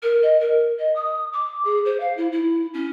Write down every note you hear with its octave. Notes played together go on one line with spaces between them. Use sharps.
A#4
D#5
A#4
D#5
D#6
D6
G#4
C5
F5
E4
E4
C#4